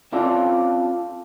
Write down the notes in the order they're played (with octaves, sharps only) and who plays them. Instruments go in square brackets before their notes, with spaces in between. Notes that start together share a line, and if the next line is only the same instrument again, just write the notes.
[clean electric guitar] C4 C#4 F4 A4 D5